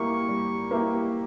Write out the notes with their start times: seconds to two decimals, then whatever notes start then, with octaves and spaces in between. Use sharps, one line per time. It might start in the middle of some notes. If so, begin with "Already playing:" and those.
Already playing: G3 A#3 E4 G4 C#6
0.29 G3
0.71 A#3 E4 G4